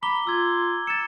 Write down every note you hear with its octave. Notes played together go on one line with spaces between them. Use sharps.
A#5 B5 D6 G7
F4 E6 G#6
E6 A6 C#7